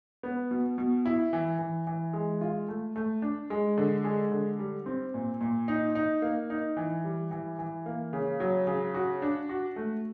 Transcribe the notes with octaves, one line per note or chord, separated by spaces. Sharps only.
B3
B2
B2
E4
E3
E3
E3
G#3
F4
A3
A3
D4
G#3
D3
G#3
D3
G3
C4
A#2
A#2
D#4
D#4
A#3
D#4
E3
G3
E3
E3
A#3
C#3
F#3
C#3
F#4
D4
F#4
A3